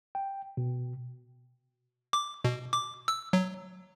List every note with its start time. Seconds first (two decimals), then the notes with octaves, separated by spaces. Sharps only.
0.15 G5
0.57 B2
2.13 D6
2.44 B2
2.73 D6
3.08 E6
3.33 F#3